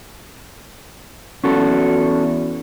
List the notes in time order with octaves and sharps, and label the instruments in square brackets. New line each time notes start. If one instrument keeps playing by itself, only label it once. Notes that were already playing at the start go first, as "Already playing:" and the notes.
[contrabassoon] E2 [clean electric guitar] C#4 F#4 A4